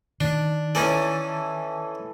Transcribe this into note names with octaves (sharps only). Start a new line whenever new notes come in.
D#3 D4
E3 C#4 D#4 A4 D5